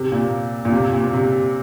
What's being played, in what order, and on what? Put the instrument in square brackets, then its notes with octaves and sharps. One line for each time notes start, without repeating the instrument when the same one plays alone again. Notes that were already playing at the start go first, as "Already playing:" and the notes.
Already playing: [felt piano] C3
A#2
A#2
C3
A#2
C3